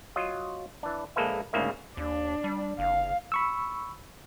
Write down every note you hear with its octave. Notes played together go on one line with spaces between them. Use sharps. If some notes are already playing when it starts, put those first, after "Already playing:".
F#3 F4 D#5
E3 D4
A#1 G#3 A#3 A4 B4 E5
D2 G#2 C#3 A#3 E5
D#2 D4
G3
F#1 F5
B5 C#6 E6